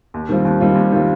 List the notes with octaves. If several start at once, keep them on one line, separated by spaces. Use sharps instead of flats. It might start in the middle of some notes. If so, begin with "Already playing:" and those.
D#2
D#3 G3 C4 F4
D#2
D#3 G3 C4 F4
D#2
D#3 G3 C4 F4